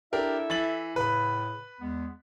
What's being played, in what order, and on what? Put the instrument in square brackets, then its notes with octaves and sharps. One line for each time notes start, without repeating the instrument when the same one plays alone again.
[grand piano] D4 G4 A#4 [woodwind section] E4 A4 E5
[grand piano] E3 A6 F#7
[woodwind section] A2 C#3 [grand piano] B4 B5
[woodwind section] E2 G#3 B3